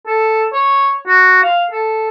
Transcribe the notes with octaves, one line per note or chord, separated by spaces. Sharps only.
A4
C#5
F#4
F5
A4